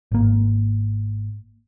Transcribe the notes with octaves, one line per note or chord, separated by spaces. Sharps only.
G#1 A#3